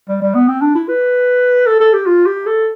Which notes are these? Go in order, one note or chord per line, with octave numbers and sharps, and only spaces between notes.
G3
G3
B3
C4
D4
E4
B4
A4
A4
G4
F4
G4
A4